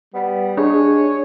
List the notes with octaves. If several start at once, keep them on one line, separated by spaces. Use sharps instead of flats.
G3 B3
G#3 D4 G#4 C#5